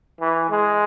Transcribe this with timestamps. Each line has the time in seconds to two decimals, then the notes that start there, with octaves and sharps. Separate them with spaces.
0.20 E3
0.50 G#3